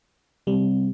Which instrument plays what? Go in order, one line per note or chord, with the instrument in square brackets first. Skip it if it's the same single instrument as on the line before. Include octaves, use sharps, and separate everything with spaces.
[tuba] C3 [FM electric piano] G3